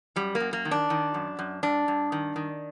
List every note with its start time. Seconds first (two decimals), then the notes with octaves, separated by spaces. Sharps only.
0.16 F#2 G3
0.35 A#3
0.40 F#2
0.53 A#3
0.65 D#3
0.71 D4
0.90 D#3
1.14 F#2
1.39 F#2
1.63 G2 D4
1.88 G2
2.12 D#3
2.36 D#3